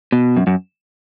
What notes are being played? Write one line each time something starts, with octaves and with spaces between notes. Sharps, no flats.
B2
F#2
F#2